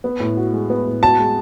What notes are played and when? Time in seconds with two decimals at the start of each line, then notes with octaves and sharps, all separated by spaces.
0.04 B3
0.20 A2
0.37 F#4
0.53 G#3
0.70 B3
0.86 A2
1.02 F#4 A5
1.18 G#3